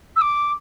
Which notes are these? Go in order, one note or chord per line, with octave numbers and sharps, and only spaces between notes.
E6
D6